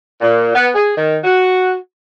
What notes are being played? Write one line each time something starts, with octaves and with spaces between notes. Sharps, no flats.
A#2
B3
G#4
D#3
F#4